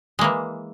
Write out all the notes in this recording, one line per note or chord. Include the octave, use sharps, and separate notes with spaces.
E3 G#3 A#3